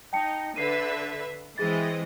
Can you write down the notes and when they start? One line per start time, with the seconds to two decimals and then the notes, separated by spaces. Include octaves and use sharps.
0.13 D#4 G5 A5 C#7
0.56 D3 B4 E5 C7 D#7
1.58 E3 G#3 C4 G#4 D#5 A6